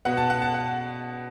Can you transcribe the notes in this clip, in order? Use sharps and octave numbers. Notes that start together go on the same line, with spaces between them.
B2 B3 F#5
A5
F#5
A5
F#5